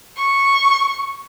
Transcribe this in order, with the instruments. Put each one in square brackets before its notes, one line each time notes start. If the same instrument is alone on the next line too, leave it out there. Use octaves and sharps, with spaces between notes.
[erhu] C#6